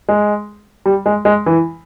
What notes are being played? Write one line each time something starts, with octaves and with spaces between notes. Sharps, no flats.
G#3
G3
G#3
G#3
E3